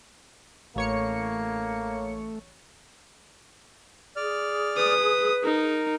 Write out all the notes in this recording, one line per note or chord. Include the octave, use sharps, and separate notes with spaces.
A1 A3 A#3 C#5 C#7
G#4 D5 F6
B4 D#6
D#4 A#4